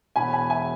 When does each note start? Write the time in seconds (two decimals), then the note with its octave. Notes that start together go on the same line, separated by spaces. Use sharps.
0.16 E1 E2 B2 G#5 B5
0.33 G#5 B5
0.50 E5 G#5